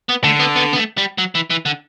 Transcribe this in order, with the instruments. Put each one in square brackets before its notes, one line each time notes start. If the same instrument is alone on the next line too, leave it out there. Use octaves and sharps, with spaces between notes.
[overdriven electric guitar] B3
[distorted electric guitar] D3 [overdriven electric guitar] A3
[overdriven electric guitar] B3
B3
B3
A3
G3
F#3
E3
E3
D3